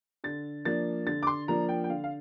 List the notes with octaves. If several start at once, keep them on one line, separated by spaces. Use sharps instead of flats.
D3 A6
F3 A#3 D4 A6
D3 A6
D6
C6
F3 A#3 D4 A#5
G5
G5
D3 F5
F5